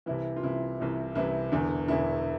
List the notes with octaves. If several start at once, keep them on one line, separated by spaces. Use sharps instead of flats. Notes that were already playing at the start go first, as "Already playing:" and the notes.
C2 C3 E3 E4
F4
C2 C3 E3 E4
C2 C3 E3
C2 C3 E3 E4
E1 E2 D3
E1 E2 D3 E4